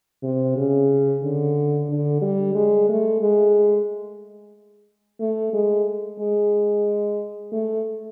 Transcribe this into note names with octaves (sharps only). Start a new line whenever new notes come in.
C3
C#3
D3
D3
G3
G#3
A3
G#3
A3
G#3
G#3
A3